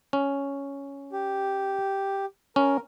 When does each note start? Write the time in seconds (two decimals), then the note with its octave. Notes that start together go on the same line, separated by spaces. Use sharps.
0.13 C#4
1.12 G4
2.56 C#4 A#4